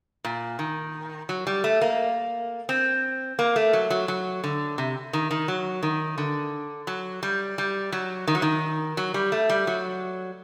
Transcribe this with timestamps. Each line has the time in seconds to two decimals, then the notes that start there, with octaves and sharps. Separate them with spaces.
0.25 A#2
0.59 D#3
1.29 F#3
1.47 G3
1.64 A3
1.81 A#3
2.69 C4
3.39 A#3
3.56 A3
3.73 F#3
3.90 F#3
4.08 F#3
4.44 D3
4.78 C3
5.13 D#3
5.31 D#3
5.48 F#3
5.83 D#3
6.18 D3
6.87 F#3
7.23 G3
7.58 G3
7.92 F#3
8.27 D#3
8.35 F#3
8.42 D#3
8.97 F#3
9.14 G3
9.32 A3
9.49 G3
9.67 F#3